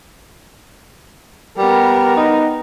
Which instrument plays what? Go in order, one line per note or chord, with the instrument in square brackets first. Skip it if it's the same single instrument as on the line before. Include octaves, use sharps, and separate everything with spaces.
[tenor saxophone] G3 [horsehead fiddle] B3 A#4
[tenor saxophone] D#4